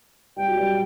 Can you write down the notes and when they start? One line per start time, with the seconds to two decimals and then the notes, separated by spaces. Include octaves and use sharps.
0.36 G3 G5
0.47 F#3
0.57 G3